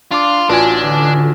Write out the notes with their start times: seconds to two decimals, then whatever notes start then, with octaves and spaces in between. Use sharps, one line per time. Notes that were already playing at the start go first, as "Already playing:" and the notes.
0.12 D4 F4 C6 D6
0.49 A1 D4 F4 F#4 B4 G#5
0.81 D3